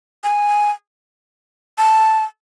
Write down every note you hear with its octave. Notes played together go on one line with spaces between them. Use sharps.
G#5
A5